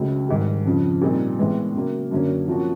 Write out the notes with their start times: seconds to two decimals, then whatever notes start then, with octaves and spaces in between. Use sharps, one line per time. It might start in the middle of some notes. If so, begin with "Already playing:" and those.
Already playing: C#2 C#3 F#3 A3
0.29 G#2 D#3 G3
0.65 F2 C#3 F3
1.01 A#2 G3 C4 D#4
1.39 A2 E3 G#3 B3
1.74 C#3 F#3 A#3
2.11 F#2 D3 F#3 A#3 C#4
2.47 C3 F3 A#3 C#4 F#4